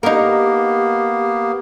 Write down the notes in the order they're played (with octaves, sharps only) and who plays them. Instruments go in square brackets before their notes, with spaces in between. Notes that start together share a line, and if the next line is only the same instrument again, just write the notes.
[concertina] A#3 B3 [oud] D#4 A#4 [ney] G4